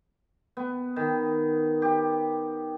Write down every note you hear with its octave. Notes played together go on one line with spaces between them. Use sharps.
B3
D#3
G4